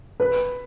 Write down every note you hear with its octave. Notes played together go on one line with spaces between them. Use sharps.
B4